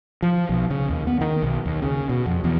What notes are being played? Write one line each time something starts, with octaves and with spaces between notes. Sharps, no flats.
F3
B1
C#3
D#2
B3
D#3
B1
D#2
C#3
B2
F2
E2